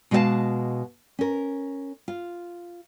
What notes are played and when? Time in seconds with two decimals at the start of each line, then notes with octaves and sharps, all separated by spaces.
0.11 B2 G#3 F#4 D#5 F5 A5
1.19 C#4 A#4
2.08 F4